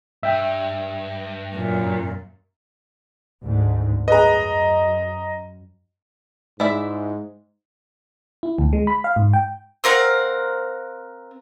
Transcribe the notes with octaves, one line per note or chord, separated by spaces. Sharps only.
G2 E5 G5
F#2 A#2
D2 G#2
F#2 G#4 B4 D#5 A#5
G#2 G#3 E4 D5 E5
E4
D2
G#3
B5
F5
G#2
G5
C4 A#4 F5 F#5